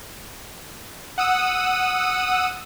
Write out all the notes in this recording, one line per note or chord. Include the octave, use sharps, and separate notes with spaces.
F#5 D#6 E6 D#7